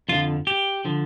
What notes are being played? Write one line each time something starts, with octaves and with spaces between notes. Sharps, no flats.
F2 D3 F3 F4
G4
D3 F3